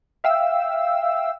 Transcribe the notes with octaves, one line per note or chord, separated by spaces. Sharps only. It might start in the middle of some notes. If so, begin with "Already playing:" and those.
E5 F5 G5 E6